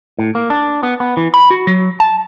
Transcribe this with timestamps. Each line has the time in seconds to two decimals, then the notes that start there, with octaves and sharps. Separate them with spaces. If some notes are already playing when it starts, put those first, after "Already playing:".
0.19 A2
0.35 A#3
0.50 D4
0.83 B3
1.00 B3
1.17 E3
1.34 B5
1.51 F#4
1.67 F#3
2.00 A5